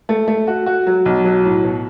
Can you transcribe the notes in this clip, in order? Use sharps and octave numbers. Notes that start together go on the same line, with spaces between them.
A3
A3
F#4
F#4
F#3
B1
F#3
A2
B2